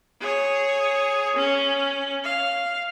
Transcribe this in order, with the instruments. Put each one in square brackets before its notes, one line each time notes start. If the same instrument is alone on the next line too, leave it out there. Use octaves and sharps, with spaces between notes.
[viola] G#4 C#5
C#4
F5